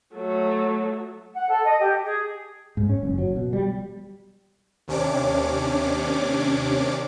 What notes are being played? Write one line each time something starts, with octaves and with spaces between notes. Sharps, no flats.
F#3 A3
F#5
A4
D#5
G4
G#4
G#2
C#4
F#1
F#3
B2
G3
D#2 C3 C#4 D4 D6